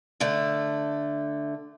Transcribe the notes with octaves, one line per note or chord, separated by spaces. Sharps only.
D3 A3